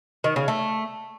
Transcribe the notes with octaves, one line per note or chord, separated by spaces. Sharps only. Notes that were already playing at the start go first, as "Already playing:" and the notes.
D#3
C#3
A3